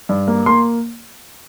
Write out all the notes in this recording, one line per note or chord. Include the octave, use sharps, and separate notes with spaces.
G2
A#3
A#3 C6